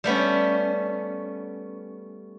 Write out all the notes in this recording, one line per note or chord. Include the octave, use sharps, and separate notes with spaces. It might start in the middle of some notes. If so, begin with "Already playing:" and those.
G3 A3 B3 C#4